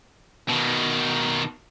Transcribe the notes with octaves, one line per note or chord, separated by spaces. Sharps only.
B2 D#3